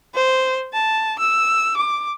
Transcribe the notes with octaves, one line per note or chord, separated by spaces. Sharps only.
C5
A5
E6
D6